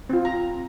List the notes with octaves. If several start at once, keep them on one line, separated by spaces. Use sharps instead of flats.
C4 F4
A#5